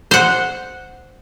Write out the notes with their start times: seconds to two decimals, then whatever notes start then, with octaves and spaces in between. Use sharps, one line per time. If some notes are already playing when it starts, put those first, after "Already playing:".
0.11 C5 F#5